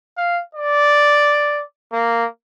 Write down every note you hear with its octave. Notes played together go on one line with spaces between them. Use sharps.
F5
D5
A#3